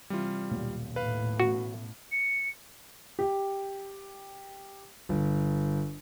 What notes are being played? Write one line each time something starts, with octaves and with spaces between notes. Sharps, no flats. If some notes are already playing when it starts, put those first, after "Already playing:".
C3 E3 G3 F4
D#1 B1 A#2
A2 B4 F5
A1 B2 F#4
C#7
G4
G1